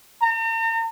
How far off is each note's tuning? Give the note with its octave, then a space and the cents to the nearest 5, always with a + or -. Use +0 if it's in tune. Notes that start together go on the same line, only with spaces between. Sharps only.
A#5 -45